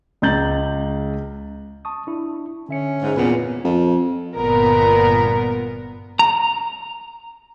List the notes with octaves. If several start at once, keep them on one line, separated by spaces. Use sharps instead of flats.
C#2 C#3 A#5 G6 A6 F#7
A5 C#6 D#6
D4 E4
D3 C#4 E5 C#7
G#2
E2 A#2 B3 C4 B4
F2
G1 A#2 B3 A#4
A#5